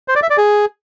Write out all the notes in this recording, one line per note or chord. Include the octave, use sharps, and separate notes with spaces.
C5
D5
E5
D5
G#4